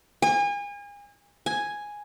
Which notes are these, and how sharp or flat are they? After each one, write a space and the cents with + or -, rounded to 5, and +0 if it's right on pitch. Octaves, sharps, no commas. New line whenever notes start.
G#5 -35
G#5 +0